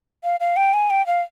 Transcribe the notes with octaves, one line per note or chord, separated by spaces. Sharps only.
F5
F5
G5
G#5
G5
F5